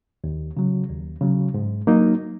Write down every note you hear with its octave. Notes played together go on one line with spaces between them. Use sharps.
D#2
C#3 F#3
D#2
C#3 F#3
G#2
F#3 A#3 D#4